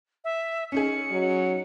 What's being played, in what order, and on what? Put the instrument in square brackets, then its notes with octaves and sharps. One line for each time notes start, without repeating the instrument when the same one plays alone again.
[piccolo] E5
[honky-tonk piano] C#4 D#4 G#4 [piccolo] C#7
[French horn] F#3